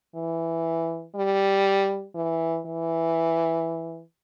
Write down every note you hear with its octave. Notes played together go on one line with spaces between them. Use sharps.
E3
G3
E3
E3